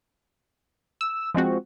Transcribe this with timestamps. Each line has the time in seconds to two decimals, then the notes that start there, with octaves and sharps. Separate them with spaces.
1.01 E6
1.34 F3 G#3 C4 F#4